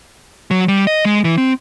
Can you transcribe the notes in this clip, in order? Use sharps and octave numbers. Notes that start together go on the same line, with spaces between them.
F#3
G3
D#5
G#3
E3
C4